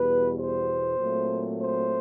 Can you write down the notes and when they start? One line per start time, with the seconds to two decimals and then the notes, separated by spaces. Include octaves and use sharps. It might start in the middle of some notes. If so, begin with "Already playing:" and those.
Already playing: E2 B2 G3 B4
0.37 C5
0.98 A#2 F#3 A3 C4
1.61 C5